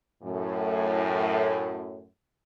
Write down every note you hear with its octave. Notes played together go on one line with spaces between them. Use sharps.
F#2 A2